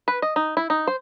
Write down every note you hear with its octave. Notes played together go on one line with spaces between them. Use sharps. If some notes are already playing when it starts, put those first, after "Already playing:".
B4
D#5
D#4
E4
D#4
C5